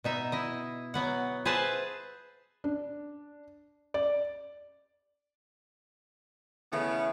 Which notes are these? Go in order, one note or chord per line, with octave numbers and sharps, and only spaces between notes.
B2 D#4 E5
E4 D#5
F#3 B3 F#5
G#4 B4 C5 E5 G#5 A5
D4
D5
C#3 E3 A3 B3